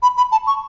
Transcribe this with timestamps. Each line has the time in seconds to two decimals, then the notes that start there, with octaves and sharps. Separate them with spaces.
0.03 B5
0.17 B5
0.32 A5
0.47 C#6